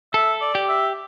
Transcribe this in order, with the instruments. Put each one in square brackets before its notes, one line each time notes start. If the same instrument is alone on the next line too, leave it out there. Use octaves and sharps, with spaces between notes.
[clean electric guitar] A4 [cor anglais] E5
[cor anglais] D5
[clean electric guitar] G4
[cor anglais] E5